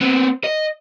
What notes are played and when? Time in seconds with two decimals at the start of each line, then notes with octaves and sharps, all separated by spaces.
0.01 B3 C4
0.44 D#5